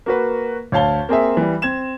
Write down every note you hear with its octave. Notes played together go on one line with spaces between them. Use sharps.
A#3 F#4 B4
D2 C#5 F5 A5 G7
A#3 C4 G#4 E5
E3 G3
C4 G#6 E7